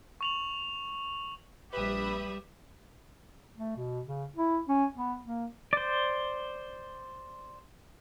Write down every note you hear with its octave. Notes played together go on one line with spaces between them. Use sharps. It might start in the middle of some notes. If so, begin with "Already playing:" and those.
C#6 F7 F#7
A#1 G3 G4 B4 E5 B5 D#6
A3
B2
C#3
E4
C#4
B3
A#3
C5 D5